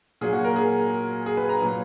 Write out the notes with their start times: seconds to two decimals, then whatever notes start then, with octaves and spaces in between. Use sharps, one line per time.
0.21 A#2 F#3 G#4
0.33 F#4
0.44 A#4
0.56 G#4
1.26 G#4
1.37 B4
1.49 A#5
1.61 A#2 F#3